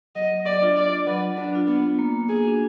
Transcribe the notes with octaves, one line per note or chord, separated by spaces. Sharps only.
F#3 D#5
D5
D4 F4
D5
F#3 B4
D4
D4 F4
B3
A#3
G#4
D4 F#4